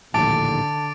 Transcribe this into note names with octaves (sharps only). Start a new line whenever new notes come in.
A#1 D#2 A2 D3 A5 D6 A6 D7